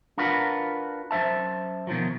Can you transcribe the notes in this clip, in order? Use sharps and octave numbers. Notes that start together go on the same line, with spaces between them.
D4 F4 F#4 A#4 B4
F#2 C5 E5 A5
B2 D#3 F3 F#3